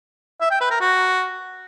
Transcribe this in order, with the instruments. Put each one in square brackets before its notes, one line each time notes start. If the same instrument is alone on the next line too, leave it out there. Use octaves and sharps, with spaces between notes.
[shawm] E5
G5
B4
A#4
F#4